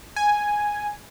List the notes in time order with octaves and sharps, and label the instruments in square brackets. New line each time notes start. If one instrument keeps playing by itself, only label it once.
[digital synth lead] G#5